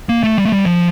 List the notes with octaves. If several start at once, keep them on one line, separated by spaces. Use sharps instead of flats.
A#3
A3
G3
A3
G3
F3